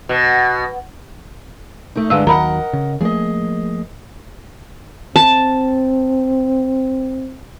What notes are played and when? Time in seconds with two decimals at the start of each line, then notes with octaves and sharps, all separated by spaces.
0.09 B2
1.96 A3 D#4
2.10 G2 D3 G#3 F5 E6
2.27 D#2 D#3 F#3 A#4 D#5 F#5 A#5 B5
2.73 C#3
3.01 F3 A3 A#3 G#4 D#5
5.16 C4 A5